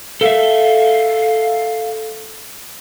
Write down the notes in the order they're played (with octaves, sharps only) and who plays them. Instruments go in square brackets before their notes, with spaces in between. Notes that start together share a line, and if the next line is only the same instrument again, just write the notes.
[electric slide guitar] A4 E5 [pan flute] F5